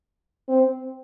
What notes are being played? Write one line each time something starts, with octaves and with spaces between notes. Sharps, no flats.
C4